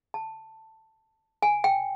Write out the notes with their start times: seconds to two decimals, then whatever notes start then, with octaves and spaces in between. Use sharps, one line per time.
0.14 A5
1.42 G#5
1.64 G5